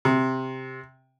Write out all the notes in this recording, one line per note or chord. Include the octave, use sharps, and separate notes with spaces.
C3